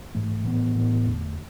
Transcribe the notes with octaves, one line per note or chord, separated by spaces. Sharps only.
G#2 E3 A3
A2 E3 B3
A2 E3 B3
E2 D3 A3